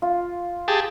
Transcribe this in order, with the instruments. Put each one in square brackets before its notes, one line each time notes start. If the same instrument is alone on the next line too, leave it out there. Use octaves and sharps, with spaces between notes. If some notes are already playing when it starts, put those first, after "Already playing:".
[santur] F4
[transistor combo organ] G4 G#4 A5